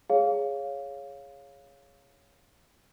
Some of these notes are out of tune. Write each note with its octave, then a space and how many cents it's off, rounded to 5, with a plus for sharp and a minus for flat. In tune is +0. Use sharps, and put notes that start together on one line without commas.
G#4 +0 C#5 +0 F5 +0